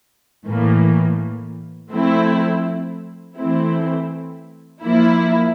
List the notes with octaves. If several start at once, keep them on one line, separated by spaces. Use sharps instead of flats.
A2 E3 A#3
F3 A3 C4 E4
E3 A3 C4 E4
F3 A#3 E4